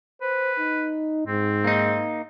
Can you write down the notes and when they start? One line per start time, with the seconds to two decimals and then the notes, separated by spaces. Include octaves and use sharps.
0.22 B4 C5
0.59 D#4
1.27 G#2 C4
1.64 A#3 D#4